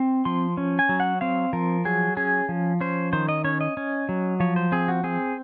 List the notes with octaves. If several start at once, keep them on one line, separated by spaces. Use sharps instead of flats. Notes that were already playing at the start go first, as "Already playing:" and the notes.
Already playing: C4
F3 C6
C#4
G#5
F#3
F#5
C4 F5
F3 A#4
F#3 G#4
C#4 G#4
F3
C#4 C5
D#3 C5
D#5
C#4 C#5
D#5
C#4
F#3
F3 C#5
C5
C4 G#4
F#4
C4 G#4